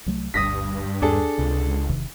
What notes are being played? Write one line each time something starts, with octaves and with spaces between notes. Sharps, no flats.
C2 F#3 A3
G1 D2 G2 D#6 A#6 B6
D#2 D4 G#4 A4
C#2 C3
E1 C3 D#3